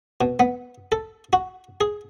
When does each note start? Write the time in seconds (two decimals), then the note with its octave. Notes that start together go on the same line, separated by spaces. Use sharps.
0.21 B2
0.40 B3
0.92 A4
1.33 F#4
1.81 G#4